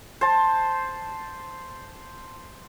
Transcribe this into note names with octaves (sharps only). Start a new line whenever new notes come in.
C5 A5